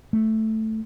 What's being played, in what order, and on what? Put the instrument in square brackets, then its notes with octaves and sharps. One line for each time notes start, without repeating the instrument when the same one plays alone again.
[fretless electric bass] A3